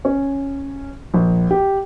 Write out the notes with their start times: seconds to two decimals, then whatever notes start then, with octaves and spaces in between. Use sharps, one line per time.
0.05 C#4
1.14 A#1
1.51 G4